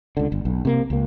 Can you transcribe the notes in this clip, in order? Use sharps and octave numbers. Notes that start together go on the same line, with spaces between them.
C#2 D3
G1
B1
C3 A#3
C#2 A#3